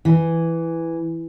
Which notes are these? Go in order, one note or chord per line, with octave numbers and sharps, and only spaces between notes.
E3